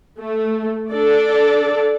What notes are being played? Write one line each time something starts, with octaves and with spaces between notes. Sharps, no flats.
A3
D4 A4 D5